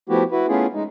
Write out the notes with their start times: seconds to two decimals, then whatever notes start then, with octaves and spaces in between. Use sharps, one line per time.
0.09 F3 A3 B3 E4 F#4 G4
0.32 E4 F#4 B4
0.48 A3 B3 C#4 E4 F4 G#4
0.74 G#3 D#4